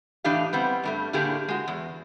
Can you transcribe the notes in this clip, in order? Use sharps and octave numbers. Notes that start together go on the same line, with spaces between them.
A2 E3 D4 D#4 G4 F5
G3 B3 C4
G2 G3 A3
A2 D3 A3 A#3 G4 G#4
G#3 F#4
E2